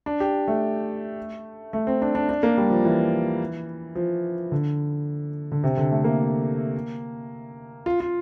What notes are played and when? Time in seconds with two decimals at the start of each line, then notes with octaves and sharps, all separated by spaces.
0.06 D4
0.20 G4
0.48 A3
1.73 A3
1.87 C4
2.02 D4
2.15 D4
2.29 D4
2.43 A#3
2.57 G3
2.70 F3
2.85 E3
3.95 F3
4.52 D3
5.52 D3
5.64 C3
5.77 D3
5.91 A3
6.04 A#3
7.86 F4
8.00 F4